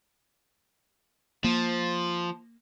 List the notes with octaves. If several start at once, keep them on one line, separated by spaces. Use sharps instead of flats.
F3 A#3